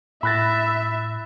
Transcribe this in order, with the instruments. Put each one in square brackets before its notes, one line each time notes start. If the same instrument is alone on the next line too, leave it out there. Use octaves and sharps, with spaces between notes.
[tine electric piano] A2 A#6 [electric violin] E5 [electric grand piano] B5 F#6 A6